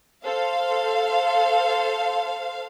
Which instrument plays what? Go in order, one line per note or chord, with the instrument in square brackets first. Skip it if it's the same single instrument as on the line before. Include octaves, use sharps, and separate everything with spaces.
[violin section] A4 C5 [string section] F5